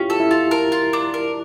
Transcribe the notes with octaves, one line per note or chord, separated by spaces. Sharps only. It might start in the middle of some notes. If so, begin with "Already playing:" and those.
Already playing: C#4 E4 F4 G4
A4
E4
F4
A#4
F4
D4
A#4